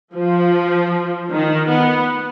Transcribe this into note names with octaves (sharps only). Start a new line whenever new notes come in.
F3
D#3
B3